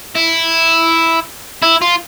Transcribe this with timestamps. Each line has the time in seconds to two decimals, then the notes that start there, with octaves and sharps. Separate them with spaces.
0.15 E4
1.63 E4
1.82 F4